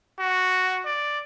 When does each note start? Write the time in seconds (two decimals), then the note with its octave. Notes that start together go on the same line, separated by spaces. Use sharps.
0.19 F#4
0.85 D5